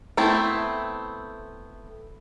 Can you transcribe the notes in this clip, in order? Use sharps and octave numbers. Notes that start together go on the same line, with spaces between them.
A3 B3 C4 E4